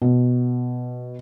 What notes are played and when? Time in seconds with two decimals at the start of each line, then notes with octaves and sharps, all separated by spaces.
0.02 B2